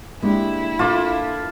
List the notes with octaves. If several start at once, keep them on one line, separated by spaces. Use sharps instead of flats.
G#3 A#3 D4 E4 G4
A#3 D4 F4 A4 A5 D6